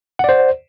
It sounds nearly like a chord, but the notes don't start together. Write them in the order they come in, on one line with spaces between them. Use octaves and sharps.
F#5 D5 C5